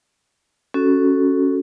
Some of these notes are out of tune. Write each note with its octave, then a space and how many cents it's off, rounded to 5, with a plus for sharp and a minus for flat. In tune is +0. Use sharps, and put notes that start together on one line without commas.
C#4 +0 F#4 +0 A4 +0